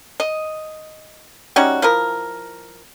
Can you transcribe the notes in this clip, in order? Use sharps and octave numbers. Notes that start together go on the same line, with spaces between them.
D#5
G3 C#4 D#4 F#4
F3 E4 A#4